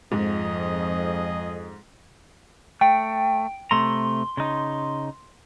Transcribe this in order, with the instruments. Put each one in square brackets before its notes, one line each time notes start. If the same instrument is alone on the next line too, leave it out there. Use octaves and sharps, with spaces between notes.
[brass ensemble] F2 [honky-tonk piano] G#2 [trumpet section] G#4 D#5
[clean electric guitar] A3 [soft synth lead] G5
[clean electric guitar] C3 A3 A#5 [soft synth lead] C6
[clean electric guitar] C#3 D#4